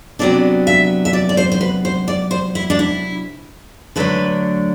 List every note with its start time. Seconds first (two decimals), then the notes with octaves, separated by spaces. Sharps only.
0.19 C3 F#3 B3 D4 D5
0.67 E5
1.05 E5
1.13 D5
1.29 D5
1.37 C5
1.52 C5
1.61 B4
1.85 C5
2.08 D5
2.31 C5
2.55 E4
2.70 D4
2.79 E4
3.96 D3 F#3 A3 D4 B4